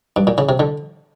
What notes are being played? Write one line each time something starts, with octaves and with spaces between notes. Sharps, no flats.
G2
A#2
C#3
C3
D3